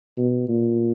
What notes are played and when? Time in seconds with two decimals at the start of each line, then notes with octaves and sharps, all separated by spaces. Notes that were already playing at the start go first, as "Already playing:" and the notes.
0.17 B2
0.49 A#2